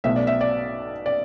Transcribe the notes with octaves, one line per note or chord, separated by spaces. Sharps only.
B1 B2 A3 E5
D5
E5
D5
D5